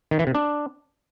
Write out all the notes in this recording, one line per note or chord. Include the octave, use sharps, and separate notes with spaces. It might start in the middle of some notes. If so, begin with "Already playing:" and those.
D#3
E3
C3
D4